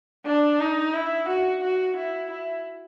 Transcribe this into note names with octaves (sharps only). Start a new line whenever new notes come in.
D4
D#4
E4
F#4
F#4
E4
E4